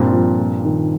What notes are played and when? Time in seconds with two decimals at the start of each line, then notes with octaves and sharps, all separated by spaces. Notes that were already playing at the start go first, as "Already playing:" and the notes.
Already playing: G2 A#2 C4
0.13 F3
0.39 A#3
0.64 D#3